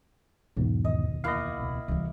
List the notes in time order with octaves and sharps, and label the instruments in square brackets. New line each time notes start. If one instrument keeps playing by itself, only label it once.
[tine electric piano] B1 E2 G#2 [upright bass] B2
[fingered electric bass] E1 D2 D#3 [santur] D#5
[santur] A#3 E4 F#5 [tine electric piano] D#5 F5
[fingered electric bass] D#1 C#2 B2
[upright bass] D2 G3 [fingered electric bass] C3 E3